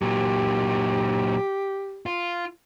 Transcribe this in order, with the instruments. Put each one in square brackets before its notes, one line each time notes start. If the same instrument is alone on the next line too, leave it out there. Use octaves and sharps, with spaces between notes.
[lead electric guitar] A#2 F#3 [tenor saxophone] G4
[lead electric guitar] F4